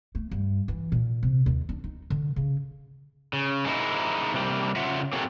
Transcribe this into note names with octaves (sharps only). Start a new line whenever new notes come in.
A3
G2
E3
A#2
C3
D#2
D4
D#4
D3
C#3
C#3
G#3 A#3 D#4 E4
C3 G3 A#3
C#3 F4 E5 F#5
A#3 C4 F#4 G#4 A4